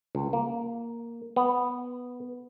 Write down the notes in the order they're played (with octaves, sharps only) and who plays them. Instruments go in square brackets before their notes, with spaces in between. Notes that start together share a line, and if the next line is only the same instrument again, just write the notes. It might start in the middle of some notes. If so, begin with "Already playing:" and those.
[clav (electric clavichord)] C#2
A#3
B3